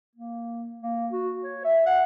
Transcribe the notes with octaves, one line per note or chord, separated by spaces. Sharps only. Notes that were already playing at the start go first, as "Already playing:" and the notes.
A#3
A#3
F#4
C#5
E5
F#5